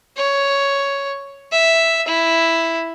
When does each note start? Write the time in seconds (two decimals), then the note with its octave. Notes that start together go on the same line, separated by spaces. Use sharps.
0.17 C#5
1.52 E5
2.08 E4